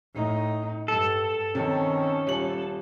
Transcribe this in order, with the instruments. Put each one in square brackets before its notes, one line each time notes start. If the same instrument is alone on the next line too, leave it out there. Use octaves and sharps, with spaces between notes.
[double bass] A2 D#4
[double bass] G2 [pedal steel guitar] A4
[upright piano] C3 [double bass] D#3 [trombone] C#4
[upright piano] D#1 F#7